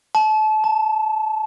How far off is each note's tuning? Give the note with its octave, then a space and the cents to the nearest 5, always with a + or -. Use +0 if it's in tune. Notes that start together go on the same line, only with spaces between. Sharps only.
A5 -30
A5 +30